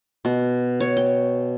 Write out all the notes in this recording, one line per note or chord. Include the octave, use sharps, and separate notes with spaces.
B2
C#5
G5